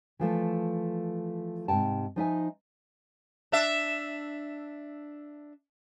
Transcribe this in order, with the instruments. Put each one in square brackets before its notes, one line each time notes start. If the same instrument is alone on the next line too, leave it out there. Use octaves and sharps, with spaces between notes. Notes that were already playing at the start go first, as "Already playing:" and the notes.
[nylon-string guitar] E3 F3 A3
G#2 C3 G5 A5
F3 D#4 E5 G#5
[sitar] D4 E5